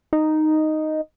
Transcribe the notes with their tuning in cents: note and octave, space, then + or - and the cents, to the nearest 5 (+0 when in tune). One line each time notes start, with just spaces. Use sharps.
D#4 -5